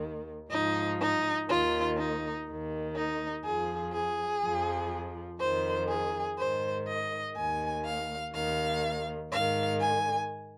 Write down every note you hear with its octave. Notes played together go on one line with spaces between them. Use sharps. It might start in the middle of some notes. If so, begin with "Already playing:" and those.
Already playing: D#2 D#3
G#2 F3 D#4
D#4
D#2 D#3 F4
D#4
D#2 D#3
D#4
F2 F3 G#4
G#4
F2 F3
F2 D#3 C5
G#4
G#2 D#3 C5
D#5
D#2 D#3 G#5
F5
D#2 D#3 F5
G#2 D#3 F5
G#5